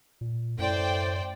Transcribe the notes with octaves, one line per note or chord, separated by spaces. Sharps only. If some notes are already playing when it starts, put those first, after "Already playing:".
A#2
F#2 A2 C5 D5 G5